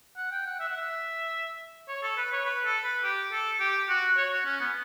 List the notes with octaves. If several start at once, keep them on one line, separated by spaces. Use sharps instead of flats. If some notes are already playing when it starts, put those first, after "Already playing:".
F#5
G5
F#5
E5
F#5
E5
C#5
A4
B4
C#5
B4
A4
B4
G4
A4
G4
F#4
C#5
F#4
C#4
B3